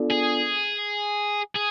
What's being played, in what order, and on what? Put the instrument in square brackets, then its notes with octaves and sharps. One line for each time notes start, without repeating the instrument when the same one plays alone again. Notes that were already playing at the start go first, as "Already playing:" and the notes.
Already playing: [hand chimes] B3 D4 F4 A4 D5
[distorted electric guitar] G#4
G#4